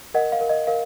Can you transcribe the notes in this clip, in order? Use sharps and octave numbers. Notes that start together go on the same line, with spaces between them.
A#4 D#5 F#5
F5
A#4
D#5
A#4 F5